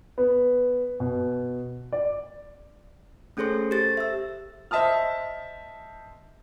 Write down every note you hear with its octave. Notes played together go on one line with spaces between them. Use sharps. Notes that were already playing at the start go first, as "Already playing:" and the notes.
B3
B2
D5
A3 C#4 G#4 A4 C5 C6
G4 A4 C5 A6
E5 E6
C5 D#5 E5 A5 D#6 F6